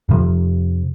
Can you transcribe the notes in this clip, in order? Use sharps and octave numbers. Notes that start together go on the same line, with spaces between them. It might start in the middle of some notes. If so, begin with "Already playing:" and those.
F2 C3 F3